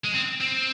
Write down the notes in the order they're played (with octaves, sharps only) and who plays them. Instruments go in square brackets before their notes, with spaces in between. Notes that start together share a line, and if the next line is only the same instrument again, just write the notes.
[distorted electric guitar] G#3
C4
C4